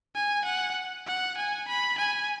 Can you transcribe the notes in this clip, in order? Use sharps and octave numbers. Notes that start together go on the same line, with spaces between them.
G#5
F#5
F#5
G#5
B5
G#5